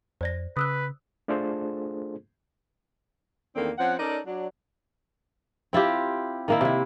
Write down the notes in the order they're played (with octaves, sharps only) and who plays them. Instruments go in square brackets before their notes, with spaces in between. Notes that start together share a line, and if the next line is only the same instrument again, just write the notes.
[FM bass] F2 [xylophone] C5 D5 A#6
[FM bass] C#3 [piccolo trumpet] B4 [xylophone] D#6 E6 F#6
[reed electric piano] A3 D4 F4 G#4 A4 C5
[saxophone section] E2 D#3 A#3 C4 D4 A4
F3 C4 C#4 F#5
C#4 D#4 A4 A#4 D5
F#3 D4
[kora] C4 E4 F4 G4
D#3 A#3 E4
C3 E4